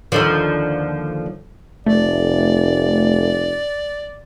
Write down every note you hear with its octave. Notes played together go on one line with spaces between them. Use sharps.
D#2 D3 F3
F1 A3 D5